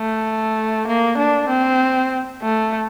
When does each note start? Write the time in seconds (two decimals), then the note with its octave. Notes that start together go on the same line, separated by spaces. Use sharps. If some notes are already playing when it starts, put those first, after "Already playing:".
Already playing: A3
0.87 A#3
1.17 D4
1.48 C4
2.43 A3